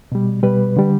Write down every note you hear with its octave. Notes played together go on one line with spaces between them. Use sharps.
B2 G3
B2 G3 B4
D3 G3